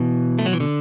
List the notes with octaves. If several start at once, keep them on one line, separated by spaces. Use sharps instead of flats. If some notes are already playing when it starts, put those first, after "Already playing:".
Already playing: B2 E3
A3
F#3
E3
D3